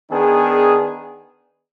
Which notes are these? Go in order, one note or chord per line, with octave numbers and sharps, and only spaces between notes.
D#3 B3 D4 G#4